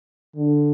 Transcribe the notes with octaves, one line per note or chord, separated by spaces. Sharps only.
D3